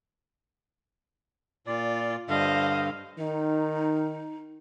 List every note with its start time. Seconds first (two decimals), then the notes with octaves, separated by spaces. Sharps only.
1.67 A#2 F4 D5
2.29 G2 D3 C5 D#5 F5
3.18 D#3 D#4